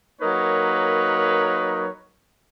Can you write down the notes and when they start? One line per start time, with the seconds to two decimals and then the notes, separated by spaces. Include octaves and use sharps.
0.22 F#3 A#3 D#4 A#4 B4 C#5